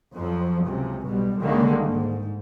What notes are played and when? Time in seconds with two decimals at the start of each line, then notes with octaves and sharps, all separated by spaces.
0.15 F2 F3 F#3
0.66 C#2 C3
1.08 B1 B2 G3
1.39 C2 D3 D#3 G#3 A#3
1.83 G#2